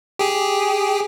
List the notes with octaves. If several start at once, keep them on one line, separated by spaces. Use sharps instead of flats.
G4 G#4